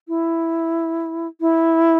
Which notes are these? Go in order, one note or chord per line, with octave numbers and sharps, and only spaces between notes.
E4
E4